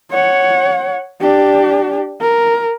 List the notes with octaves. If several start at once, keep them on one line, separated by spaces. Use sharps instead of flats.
C#5 F#5
D4 G4
A#4